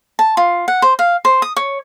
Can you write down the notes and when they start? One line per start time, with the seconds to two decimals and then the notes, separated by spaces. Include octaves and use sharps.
0.19 A5
0.37 F4
0.68 F#5
0.82 C5
0.99 F5
1.25 C5
1.42 D#6
1.56 C#5